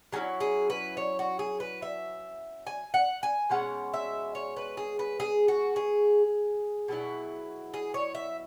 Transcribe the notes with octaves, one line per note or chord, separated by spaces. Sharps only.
F#3 C#4 E4 G#4
G#4
B4
C#5
F#4
G#4
B4
E5
G#5
F#5
G#5
B2 G#3 C#4 F#5
E5
C#5
B4
G#4
B4
G#4
F#4
G#4
B2 F#3 E4
G#4
C#5
E5